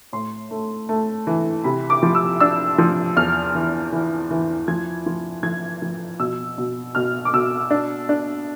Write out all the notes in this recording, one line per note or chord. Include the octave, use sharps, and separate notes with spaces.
A2 C6
A3
A3
E3
C3 B5
D6
F3
E6
D4 E6
F3
E2 F6
E3
E3
E3
F3 G#6
F3
F3 G#6
F3
B2 E6
B2
B2 F6
D6
B2 E6
D4
D4